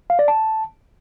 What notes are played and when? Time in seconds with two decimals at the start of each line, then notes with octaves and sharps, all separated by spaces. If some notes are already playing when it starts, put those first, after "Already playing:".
0.10 F5
0.19 D5
0.28 A5